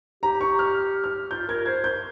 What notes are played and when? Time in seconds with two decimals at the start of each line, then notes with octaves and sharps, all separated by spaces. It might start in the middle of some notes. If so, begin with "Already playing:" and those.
0.23 G4 A#5
0.41 C#6
0.59 F6
1.04 F6
1.30 F4 G6
1.48 A#4 G#6
1.66 C5 G#6
1.84 G6